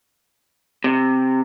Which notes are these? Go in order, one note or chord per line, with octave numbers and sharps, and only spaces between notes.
C3